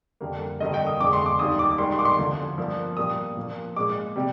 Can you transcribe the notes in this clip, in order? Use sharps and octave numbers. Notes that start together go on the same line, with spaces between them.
F2 D3 G3 A#3
G2 D3 G3 A#3 D#5
G5
D#6
F2 D3 G#3 D6
C6
D6
D#2 D#3 G3 D#6
D6
G#2 G3 A#3 C6
C6
D6
C6
D2 D3 F3
G2 F3 A#3
A#2 G3 A#3 D#6
A#2 F3 A#3
A#2 G#3 D6
C3 G3